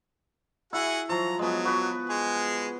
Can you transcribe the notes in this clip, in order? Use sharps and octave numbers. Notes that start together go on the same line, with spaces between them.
E4 F#4 G#4 F#5
F3 F#3 A#5
F#3 G#3 B3
F#4 B4
G#3 G#4